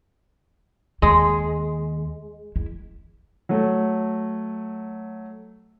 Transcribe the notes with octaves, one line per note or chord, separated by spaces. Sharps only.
D#2 G#3
E4
F#3 A3